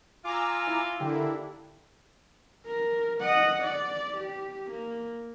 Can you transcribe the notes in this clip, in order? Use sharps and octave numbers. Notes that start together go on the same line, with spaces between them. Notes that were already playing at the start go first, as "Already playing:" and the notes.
F4 G#5 A#5 D6 E6
E4
D3 A#3 D4 E4 G4
A#4
D#5 F#5
D5
G4
A#3